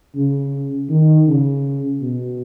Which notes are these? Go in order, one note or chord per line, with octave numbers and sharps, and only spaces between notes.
C#3
D#3
C#3
B2